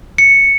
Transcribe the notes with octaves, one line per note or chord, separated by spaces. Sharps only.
C#7